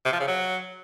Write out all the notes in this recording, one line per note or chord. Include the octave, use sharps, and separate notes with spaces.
C3
F3
C#3
F#3